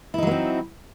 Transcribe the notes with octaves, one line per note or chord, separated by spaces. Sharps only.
F#3 A#3 C4 D#4 E4